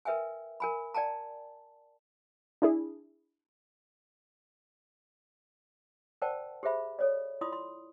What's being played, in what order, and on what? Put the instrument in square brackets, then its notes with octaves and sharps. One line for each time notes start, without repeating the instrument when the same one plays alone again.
[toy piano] A#4 B4 E5 G5 G#5
A#4 G#5 B5
D5 G5 A5 A#5
[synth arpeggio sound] D4 E4 G#4
[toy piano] A#4 C5 D5 F#5 G5 A5
G4 G#4 C5 E5 B5
A4 C#5 D5
E4 F4 D5 C6 D#6
C6